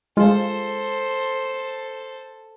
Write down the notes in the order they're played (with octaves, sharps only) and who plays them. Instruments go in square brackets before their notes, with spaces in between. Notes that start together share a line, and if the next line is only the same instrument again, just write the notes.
[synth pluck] G#3 F4 [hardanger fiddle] A4 C5